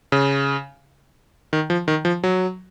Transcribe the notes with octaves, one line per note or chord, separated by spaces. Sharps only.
C#3
D#3
F3
D#3
F3
F#3